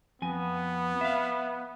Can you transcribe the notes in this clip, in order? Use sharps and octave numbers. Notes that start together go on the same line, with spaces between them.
F2 B3 G#5
E5 F5